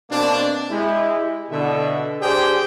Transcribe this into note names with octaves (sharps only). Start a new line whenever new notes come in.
B2 A#3 C4 D4
G#3 E4 G4
B2 D3 E5
D4 G4 G#4 C5 G5